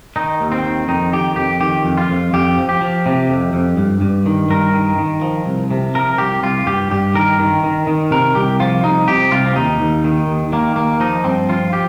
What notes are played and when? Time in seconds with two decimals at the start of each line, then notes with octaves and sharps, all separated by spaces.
0.16 D#3 D#4
0.41 D#2
0.52 C4
0.65 D#3
0.88 F2 D#4
1.13 D#3 G4
1.36 F2 G4
1.60 D#3 G4
1.85 F2
1.98 F4
2.09 F2
2.33 F2 G4
2.57 F3
2.69 G4
2.81 F3
3.06 C3
3.29 F2
3.53 F2
3.77 G2
4.01 G2
4.26 D#3
4.49 G2 A#4
4.74 D#3
4.98 D#3
5.22 F3
5.46 C2
5.71 C3
5.94 F3 A#4
6.18 C2 G4
6.43 C2 F4
6.67 G2 G4
6.91 G2 G4
7.14 D#3 A#4
7.39 D#3
7.64 D#3
7.87 D#3
8.11 C3 A#4
8.35 C2 G4
8.60 F3 F4
8.84 C2 D#4
9.08 C3 G4
9.31 C2 F4
9.46 C4
9.56 D#2 D#4
9.81 D#2
10.04 D#3
10.28 D#2
10.53 D#3 A#3
10.76 D#2 A#3
11.00 F3 D#4
11.24 G2 C4
11.49 F3 F4
11.73 G4